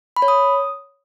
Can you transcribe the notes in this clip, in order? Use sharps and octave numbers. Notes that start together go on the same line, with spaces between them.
B5
C#5
D#6